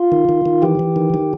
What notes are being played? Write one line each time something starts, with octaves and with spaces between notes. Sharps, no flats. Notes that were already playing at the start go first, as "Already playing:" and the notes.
Already playing: F4
D#3
D#3
D#3
E3 G4
E3
D#3
D#3